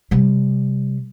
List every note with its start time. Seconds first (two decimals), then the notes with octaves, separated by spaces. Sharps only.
0.11 C3 G3